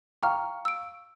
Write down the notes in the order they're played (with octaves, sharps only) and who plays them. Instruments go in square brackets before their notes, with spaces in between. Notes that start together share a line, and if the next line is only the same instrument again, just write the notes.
[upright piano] F5 C#6 [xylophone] G5 A#5 F6
[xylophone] E6 D7